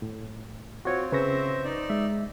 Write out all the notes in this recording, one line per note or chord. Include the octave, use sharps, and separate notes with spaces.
A2
C4 F4 F#4 C#5
C#3 C4 B4 C5 E5 C#6 A#6
D#4 D5
G#3 E5